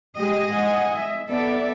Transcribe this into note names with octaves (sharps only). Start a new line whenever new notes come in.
G#3 G4 G#4 D#5
F#5 G#5
E5
B3 A4 D5 E5